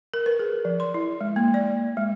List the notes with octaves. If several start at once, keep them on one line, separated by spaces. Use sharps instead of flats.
A#4
B4
G#4
F3
C6
E4
G#3
A#3
D5
G#3